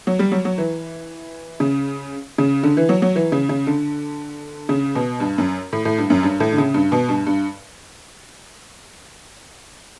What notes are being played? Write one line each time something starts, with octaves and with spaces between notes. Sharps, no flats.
F#3
G3
F#3
F#3
E3
C#3
C#3
D3
E3
F#3
F#3
E3
C#3
C#3
D3
C#3
B2
G2
F#2
A2
A2
G2
F#2
G2
A2
D3
C#3
G2
B2
G2
G2